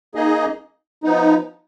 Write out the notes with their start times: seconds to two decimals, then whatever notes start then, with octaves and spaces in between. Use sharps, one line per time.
0.15 A#3 D#4 G#4 D#5
1.03 F3 B3 D#4